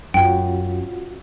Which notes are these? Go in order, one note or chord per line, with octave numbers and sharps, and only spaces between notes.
F#2 C#4 F4 F#4 G5